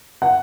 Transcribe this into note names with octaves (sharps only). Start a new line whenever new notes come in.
F#5